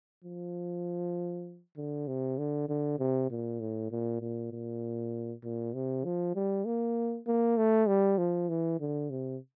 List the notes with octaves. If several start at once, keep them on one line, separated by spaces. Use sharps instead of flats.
F3
D3
C3
D3
D3
C3
A#2
A2
A#2
A#2
A#2
A#2
C3
F3
G3
A#3
A#3
A3
G3
F3
E3
D3
C3